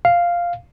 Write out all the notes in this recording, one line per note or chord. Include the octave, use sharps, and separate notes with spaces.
F5